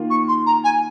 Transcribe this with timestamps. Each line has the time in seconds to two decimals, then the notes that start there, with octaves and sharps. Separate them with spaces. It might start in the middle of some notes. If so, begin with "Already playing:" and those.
Already playing: D#3 A#3 F4
0.10 C#6
0.28 C6
0.46 A#5
0.64 G#5